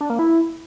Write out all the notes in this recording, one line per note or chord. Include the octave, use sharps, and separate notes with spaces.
D4
A#3
E4